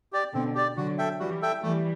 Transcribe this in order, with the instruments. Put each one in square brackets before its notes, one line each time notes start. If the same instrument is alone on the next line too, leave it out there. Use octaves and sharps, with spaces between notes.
[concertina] G4 D5
[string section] B2 D3 [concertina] C4
[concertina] G4 D5
[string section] D3 F#3 [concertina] F#4
[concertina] A4 E5 G5
[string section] E3 G3 [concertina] F#4
[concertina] A4 E5 G5
[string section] E3 G3 [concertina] A3